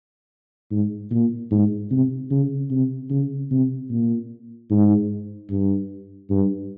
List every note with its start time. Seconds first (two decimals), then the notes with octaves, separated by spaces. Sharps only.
0.71 G#2
1.11 A#2
1.51 G#2
1.91 C3
2.31 C#3
2.71 C3
3.11 C#3
3.51 C3
3.90 A#2
4.70 G#2
5.50 G2
6.30 G2